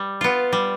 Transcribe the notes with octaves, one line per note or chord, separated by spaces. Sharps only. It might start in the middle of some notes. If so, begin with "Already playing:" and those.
Already playing: G3
B3 F4
G3